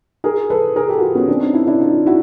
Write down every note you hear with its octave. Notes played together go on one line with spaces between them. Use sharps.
G#4 A#4
A4 B4
G#4 A#4
G4 A4
F#4
F4 G4
B3 C#4
C4 D4
C#4 D#4
D4 E4
D4 E4
D#4 F4
E4 F#4